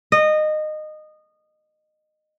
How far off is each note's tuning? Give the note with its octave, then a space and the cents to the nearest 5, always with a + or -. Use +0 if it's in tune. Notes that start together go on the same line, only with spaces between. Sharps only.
D#5 -20